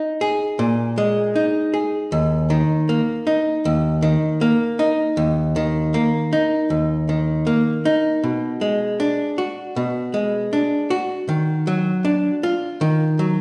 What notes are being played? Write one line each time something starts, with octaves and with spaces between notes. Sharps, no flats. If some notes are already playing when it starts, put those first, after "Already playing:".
Already playing: D#4
G#4
A#2
G#3
D#4
G#4
D#2
D#3
A#3
D#4
D#2
D#3
A#3
D#4
D#2
D#3
A#3
D#4
D#2
D#3
A#3
D#4
B2
G#3
D4
F#4
B2
G#3
D4
F#4
D#3
F#3
D4
F4
D#3
F#3